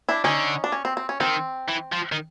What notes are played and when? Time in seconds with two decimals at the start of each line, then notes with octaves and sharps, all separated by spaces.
0.09 D4 E4
0.24 D3 C#4 D#4
0.64 D4
0.72 C#4
0.85 C4
0.97 C4
1.09 C#4
1.20 D#3 C4
1.68 E3
1.92 F3
2.12 D#3